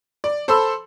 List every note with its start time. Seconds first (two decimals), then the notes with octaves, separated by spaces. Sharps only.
0.24 D5
0.48 A4 C5 B5 C6 E6